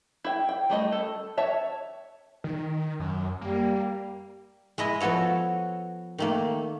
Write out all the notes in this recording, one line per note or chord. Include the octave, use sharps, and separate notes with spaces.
E4 G5
G5
G3 A3 D#5
A4
C#5 E5 A5
D#3
F#2
G3 A#3
G#3 E4 D#5
F3 B3 F#4 A4 C#5
D#3 A3 A#3